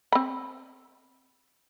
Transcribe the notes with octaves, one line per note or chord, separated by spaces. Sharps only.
C4 B5